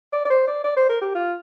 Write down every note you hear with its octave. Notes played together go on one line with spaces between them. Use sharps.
D5
D5
C5
D5
D5
C5
A#4
G4
F4